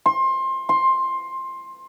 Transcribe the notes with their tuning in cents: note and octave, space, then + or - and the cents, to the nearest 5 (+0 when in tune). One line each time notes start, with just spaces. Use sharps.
C6 +25
C6 +15